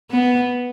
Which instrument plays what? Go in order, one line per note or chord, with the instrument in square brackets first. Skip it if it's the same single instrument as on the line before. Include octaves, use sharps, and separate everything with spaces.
[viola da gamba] B3